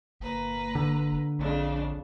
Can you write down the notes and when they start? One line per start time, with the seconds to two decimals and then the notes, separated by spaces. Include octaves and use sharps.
0.20 G1 A#2 B4 A#5
0.75 D3
1.39 A#1 F2 C#3 D4